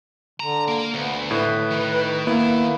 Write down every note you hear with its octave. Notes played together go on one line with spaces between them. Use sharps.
D3 A#5
A#3
D2 B3
A2 B4
D#3
A#3 B3 E4